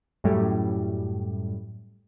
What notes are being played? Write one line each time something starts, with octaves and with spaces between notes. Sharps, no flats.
F#2 A2 G3